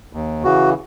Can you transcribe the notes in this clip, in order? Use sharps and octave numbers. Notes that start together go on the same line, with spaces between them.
D#2
C#3 E3 F#4